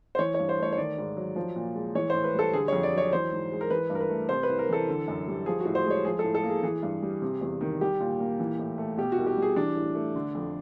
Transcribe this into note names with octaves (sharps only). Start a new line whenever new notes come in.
C5
E3 C#5
G2 C#5
C5
A3 C#5
C#5
D#3 D5
G#2
F#3
F3
A#2
G#3
E3 C#5
A2 C5
B4
G3 A4
D3 G#4
F2 C#5
D5
F#3 C#5
E3 C5
G#2
G#3
A#4
E3 B4
G2
A#4
B4
A3
C3 C5
B4
C2
A#4
E3 A4
D3
F#2
G3
F3 G#4
A2 F#4
C5
G#3 C#5
F3 G#4
A2 A4
A4
A#3
G#4
E3 G#4
G2
G3
C3
E2
D#3
G3 G4
A#2
A#3
E3
A2
A3
B2 G4
F#4
C2
G4
G3
G#4
E3 D4
A2
A3
D3
F2